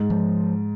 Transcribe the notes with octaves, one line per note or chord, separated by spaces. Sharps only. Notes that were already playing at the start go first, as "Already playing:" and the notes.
Already playing: G#2
F3